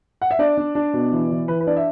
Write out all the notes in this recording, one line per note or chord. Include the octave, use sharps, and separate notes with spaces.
F#5
E5
D4 D5
D4
D4
B2
E3
E3
E3 B4
B4
D4 D5
E5